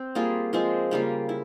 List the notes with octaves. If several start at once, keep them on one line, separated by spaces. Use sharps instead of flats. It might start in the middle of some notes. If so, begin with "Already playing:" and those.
Already playing: C4
G3 A#3 F4 G#4
F3 G#3 C4 F4
C#3 G3 A#3 F4
E4